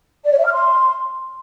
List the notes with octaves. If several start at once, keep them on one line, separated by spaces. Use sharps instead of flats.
D5
C#5
E5
F6
C6